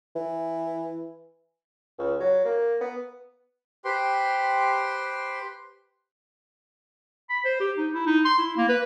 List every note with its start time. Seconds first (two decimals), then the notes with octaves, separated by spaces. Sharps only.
0.15 E3
1.98 C#2
2.20 F#3
2.45 A#3
2.81 B3
3.85 G4 B4 C5 G5 C6
7.29 B5
7.45 C5
7.60 G4
7.78 D#4
7.93 E4
8.07 D#4
8.25 C6
8.38 E4
8.57 A#3
8.69 B4